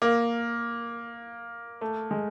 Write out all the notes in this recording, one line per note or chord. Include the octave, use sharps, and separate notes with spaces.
A#3
A3
G#3